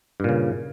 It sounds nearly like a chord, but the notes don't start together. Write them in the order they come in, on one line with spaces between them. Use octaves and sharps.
G2 A#2 C#3